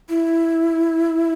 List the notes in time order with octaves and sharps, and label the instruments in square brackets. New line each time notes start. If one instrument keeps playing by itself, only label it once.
[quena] E4